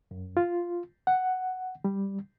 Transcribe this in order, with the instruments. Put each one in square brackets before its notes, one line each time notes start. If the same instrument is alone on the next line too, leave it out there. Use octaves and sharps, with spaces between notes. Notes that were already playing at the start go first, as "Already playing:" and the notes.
[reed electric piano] F#2
F4
F#5
G3